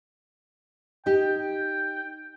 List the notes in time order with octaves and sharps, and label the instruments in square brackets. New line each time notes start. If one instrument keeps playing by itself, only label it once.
[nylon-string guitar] D#4 G4 [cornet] G5